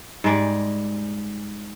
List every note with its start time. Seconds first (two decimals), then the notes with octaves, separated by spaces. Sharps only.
0.24 G#2 G3 G#3 D5